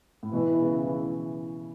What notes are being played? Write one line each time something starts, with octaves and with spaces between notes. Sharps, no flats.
A2
B2 E3
C#3
E3